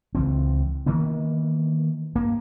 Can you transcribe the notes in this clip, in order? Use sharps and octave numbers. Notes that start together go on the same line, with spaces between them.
C#2 E3 C4
D#3 E3 A#3 B3
G2 A#3